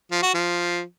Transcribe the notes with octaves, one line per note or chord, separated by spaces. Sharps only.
F3
F#4
F3